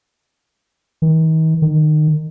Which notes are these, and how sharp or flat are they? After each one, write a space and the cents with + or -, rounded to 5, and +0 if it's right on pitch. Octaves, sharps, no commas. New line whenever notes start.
D#3 +40
D#3 -25